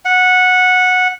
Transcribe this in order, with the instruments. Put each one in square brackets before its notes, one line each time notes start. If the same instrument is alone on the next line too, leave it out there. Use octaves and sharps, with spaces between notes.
[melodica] F#5